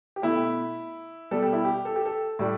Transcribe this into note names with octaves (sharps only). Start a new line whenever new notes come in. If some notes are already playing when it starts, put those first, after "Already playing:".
G4
B2 A3 E4
B2 G3 A4
G4
E4
G4
A4
G4
A4
A2 G3